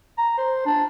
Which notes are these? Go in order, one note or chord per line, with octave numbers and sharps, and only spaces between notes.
A#5
C5
D4